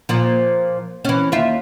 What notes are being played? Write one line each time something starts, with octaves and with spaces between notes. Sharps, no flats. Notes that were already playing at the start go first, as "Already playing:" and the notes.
A#2 F3
E3 C#4
D#2 F4 E5